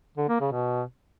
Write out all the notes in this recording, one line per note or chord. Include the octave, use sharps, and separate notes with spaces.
D3
A#3
C#3
B2